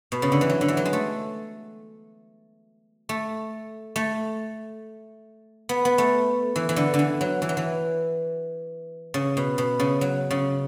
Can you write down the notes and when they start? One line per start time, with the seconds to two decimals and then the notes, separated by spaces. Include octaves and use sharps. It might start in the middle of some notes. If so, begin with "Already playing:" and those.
0.12 B2
0.22 C#3
0.32 D3
0.41 E3
0.50 F#3
0.61 D3
0.68 E3
0.77 F#3
0.85 G#3
0.93 A3
3.09 A3
3.96 A3
5.69 B3
5.85 B3
5.98 A3
6.56 E3
6.69 E3
6.76 D3
6.94 D3
6.99 E3
7.21 F#3
7.42 E3
7.49 F#3
7.57 E3
9.14 C#3
9.37 B2
9.58 B2
9.80 C#3
10.01 F#3
10.31 C#3